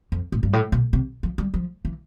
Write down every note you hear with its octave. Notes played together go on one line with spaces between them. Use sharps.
F2
A2
G2
A2
B2
C3
F3
G3
F3
E3